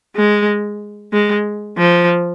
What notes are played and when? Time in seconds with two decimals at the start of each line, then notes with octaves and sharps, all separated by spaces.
0.16 G#3
1.13 G#3
1.78 F3